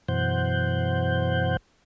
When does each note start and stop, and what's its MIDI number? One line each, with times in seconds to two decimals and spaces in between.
0.09 1.57 42
0.09 1.57 47
0.09 1.57 52
0.09 1.57 72
0.09 1.57 78
0.09 1.57 91